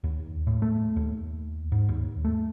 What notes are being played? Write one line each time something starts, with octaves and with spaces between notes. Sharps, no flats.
D#2
A2
A3
D#2
G#2
D#2
A3